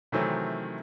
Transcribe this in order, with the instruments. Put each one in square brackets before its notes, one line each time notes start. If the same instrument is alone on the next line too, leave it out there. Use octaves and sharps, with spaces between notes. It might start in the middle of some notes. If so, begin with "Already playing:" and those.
[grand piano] C3 D#3 E3 F#3 A3 C4